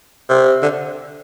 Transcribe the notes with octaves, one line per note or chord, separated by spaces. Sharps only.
C3
D3